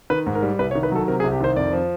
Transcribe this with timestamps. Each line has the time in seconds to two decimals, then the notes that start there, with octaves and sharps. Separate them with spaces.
0.10 D#3 B4
0.26 G#2
0.35 A#4
0.43 G3
0.59 C2 B4
0.71 C#5
0.75 D#3
0.83 B4
0.92 F#3 A4
1.08 C3 A#4
1.20 G#4
1.24 C2
1.32 G4
1.41 D#3 C5
1.56 F2 D5
1.73 F3